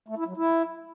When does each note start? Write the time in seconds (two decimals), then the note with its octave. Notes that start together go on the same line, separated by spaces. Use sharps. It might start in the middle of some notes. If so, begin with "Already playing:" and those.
0.08 A3
0.18 E4
0.27 F#3
0.37 E4